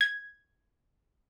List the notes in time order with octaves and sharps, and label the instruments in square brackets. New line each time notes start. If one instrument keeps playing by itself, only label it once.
[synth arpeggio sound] G#6